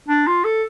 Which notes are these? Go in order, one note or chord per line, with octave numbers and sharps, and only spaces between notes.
D4
F4
A4